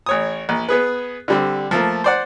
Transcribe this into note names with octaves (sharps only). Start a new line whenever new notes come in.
A1 C#5 D#6
A#1
B3 G#4 B4
D3 G3 C4
F3 A3 A#3
C5 D5 F#5